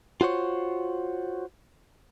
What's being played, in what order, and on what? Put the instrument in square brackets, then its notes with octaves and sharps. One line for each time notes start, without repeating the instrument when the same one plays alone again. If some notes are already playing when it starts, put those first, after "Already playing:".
[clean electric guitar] F4 F#4 C5 C#5